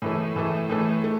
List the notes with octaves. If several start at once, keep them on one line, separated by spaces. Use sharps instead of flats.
A2 E3 A3
A2 E3 A3
A2 E3 A3
A3